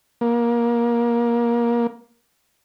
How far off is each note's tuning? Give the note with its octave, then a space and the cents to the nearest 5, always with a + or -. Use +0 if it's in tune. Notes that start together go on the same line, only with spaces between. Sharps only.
A#3 +20